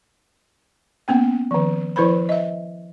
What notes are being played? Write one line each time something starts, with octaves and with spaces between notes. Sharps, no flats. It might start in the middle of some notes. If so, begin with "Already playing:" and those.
A#3 B3 C#4 G5
D#3 F3
F3 E4 B4 C5 B5
D#5 E5